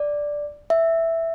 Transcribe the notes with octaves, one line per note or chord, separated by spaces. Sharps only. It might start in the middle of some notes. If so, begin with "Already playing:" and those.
Already playing: D5
E5